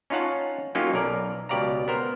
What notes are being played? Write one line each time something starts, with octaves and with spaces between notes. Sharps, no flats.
C#4 D#4 F4 C#5 F#5 A5
F#3 A#3 C#4 D#4 F4 G4
B1 A#4 D5
C#2 B2 G4 D5 F5 A#5
B3 A#4 C5